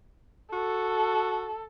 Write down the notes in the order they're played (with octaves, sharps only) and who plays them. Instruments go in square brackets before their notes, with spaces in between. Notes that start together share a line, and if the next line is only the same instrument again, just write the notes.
[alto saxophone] F#4 [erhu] A4